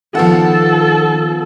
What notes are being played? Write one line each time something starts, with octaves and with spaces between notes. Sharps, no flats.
D#3 F3 B3 A4 F#5